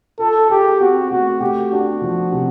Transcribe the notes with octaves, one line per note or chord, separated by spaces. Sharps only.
F4 A4
G4 G#4
C4 F#4
A3 F#4
A3 G4
D4 F#4
F3
C3